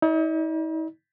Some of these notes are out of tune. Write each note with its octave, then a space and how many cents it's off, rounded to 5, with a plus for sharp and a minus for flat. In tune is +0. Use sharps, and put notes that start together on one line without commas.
D#4 +45 D5 +0